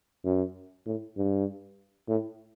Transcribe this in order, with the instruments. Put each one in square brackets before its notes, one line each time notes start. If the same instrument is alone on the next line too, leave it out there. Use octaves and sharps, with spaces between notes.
[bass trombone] F#2
A2
G2
A2